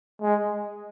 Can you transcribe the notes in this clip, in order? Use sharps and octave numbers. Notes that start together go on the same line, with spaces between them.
G#3